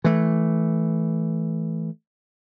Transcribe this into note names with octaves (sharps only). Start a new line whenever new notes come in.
E3 A3